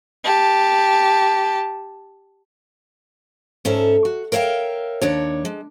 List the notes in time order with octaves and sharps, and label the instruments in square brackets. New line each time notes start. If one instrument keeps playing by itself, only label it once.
[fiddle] G4 A5
[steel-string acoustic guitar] G#2 C#4 A4 E5
F#4
A#4 C#5 E5 F5 G5
D#2 D4 C#5
G#3